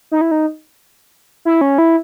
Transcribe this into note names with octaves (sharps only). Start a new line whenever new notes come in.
D#4
E4
D#4
E4
C#4
E4